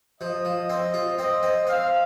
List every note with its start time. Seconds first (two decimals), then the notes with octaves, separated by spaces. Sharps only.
0.21 F3 D#5
0.45 F3
0.70 C4
0.94 F4
1.19 C4 D#5
1.43 C4
1.67 C4 F5